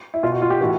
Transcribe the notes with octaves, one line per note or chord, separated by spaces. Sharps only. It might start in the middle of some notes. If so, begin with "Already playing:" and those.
E4
B2 F4
F#4
F4
G4
A2 E3 F#4